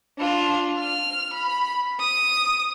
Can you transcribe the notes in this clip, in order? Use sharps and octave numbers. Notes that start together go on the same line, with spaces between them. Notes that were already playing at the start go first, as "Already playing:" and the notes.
D4 F4
F6
B5
D#6